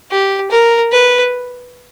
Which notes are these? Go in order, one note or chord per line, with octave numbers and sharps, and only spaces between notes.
G4
A#4
B4